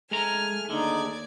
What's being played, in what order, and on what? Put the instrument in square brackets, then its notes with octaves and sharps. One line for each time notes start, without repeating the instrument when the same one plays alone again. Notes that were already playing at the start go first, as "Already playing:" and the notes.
[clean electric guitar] G#3 A#5 [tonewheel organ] A3 G#4 A4 [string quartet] G#5 F6
[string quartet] D#2 D5 G#6 [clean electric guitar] D3 [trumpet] D#4